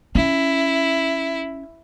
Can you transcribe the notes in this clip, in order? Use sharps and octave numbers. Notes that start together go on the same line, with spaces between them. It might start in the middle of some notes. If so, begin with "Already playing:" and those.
C#4 E4